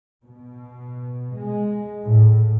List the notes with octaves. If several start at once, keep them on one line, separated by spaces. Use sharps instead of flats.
B2
G#3
A2